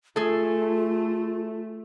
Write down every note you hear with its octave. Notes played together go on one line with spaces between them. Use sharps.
A3 F4 G#4 A4